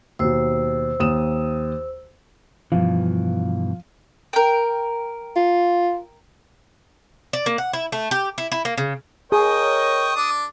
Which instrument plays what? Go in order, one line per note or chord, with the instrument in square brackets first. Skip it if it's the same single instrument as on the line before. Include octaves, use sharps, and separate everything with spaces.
[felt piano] D#2 B2 [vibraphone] C5 E6
[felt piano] D#2 D#6 E7
[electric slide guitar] G2 B2 E3 [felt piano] F3 F5
[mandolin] A#4 G5
[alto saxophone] F4
[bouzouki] D5
A#3
F#5
E4
A3
G4
E4
E4
A#3
C#3
[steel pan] G#4 [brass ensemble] A#4 C#5 D#5 [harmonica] G5 C#6 [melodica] D#6
[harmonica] D4 D5